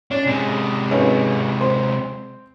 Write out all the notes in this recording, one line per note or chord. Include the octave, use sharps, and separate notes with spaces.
C#4 D4
C3 G#3
G#1 B3 C#4
C4 C5